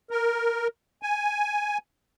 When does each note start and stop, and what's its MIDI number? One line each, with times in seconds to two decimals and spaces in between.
0.11 0.68 70
1.03 1.78 80